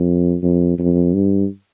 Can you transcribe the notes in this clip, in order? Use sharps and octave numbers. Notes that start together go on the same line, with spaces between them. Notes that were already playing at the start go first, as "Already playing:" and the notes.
Already playing: F2
F2
F2
G2